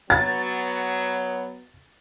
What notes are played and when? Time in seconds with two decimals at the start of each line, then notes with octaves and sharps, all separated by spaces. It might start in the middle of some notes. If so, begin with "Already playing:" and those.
0.10 F#3 B3 A6